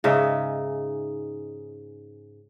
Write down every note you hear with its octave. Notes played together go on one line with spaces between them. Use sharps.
G#2 C#3 D#4 E5